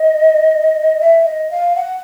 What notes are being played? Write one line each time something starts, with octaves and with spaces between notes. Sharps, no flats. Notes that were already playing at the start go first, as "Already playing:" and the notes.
Already playing: D#5
E5
D#5
F5
F#5